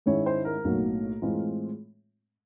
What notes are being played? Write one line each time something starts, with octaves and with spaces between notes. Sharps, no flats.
G#2 D#3 G#3 C#4 E4 C#5
C5
A#4
B1 A2 F#3 A#3 D#4
A2 E3 G#3 C4 F4